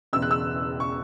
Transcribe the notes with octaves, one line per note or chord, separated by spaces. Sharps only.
E1 E2 C#3 E6
F#6
E6
C#6